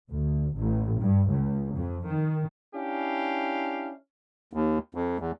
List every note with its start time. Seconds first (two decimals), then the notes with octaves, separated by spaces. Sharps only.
0.10 D2
0.55 A1
1.00 G2
1.29 C#2
1.75 F2
2.07 D#3
2.75 C#4 D4 E4 G4 F5
4.53 D#2
4.95 F2
5.20 E2